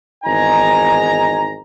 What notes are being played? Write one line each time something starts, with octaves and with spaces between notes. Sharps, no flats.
G#1 E2 D#4 G#5 A#5